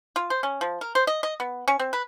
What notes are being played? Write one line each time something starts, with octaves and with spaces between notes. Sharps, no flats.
F4
C5
C#4
F3
A#4
C5
D#5
D#5
B3
C#4
C4
B4